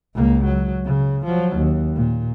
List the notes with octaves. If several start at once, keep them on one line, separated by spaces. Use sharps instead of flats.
C#2 A#3
F#3
C#3
F3 F#3
D#2
A#2